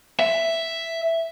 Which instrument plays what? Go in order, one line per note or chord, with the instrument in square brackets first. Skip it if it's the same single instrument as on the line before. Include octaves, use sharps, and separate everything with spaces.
[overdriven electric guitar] E5